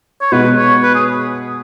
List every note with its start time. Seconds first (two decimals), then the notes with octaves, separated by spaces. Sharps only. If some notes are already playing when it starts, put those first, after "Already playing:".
0.21 C#5
0.32 B2 G#3 D#4 F#4 B4
0.57 C#5
0.83 B4
0.95 G#4